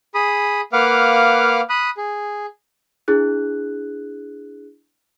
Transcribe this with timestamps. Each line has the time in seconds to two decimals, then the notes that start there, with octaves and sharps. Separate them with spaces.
0.15 G#4 B5 D#6
0.73 A#3 B4 F5 F#5 D6 F6
1.69 B5 D#6 F#6
1.97 G#4
3.08 D4 E4 G#4 F#6